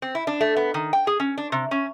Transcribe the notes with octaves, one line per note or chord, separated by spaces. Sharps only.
C4
E4
D4
A3
B3
D#3
G5
G#4
C#4
D4
C3
C#4